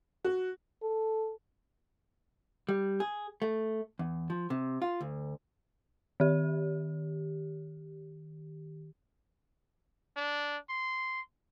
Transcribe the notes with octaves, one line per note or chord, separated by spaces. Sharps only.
F#4
A4
G3
G#4
A3
E2
F3
C3
F4
D2
D#3 G4
D4
C6